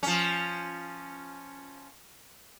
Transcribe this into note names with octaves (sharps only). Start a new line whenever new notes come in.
F3 C#4